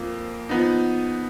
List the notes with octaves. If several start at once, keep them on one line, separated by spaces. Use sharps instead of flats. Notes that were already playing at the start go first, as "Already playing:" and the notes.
Already playing: F2 F3 A#3
F3 B3 D#4